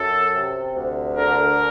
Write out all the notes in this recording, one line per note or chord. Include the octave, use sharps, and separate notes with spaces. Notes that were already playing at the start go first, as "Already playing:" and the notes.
Already playing: F#2 A4
C3
D2
D3 A#4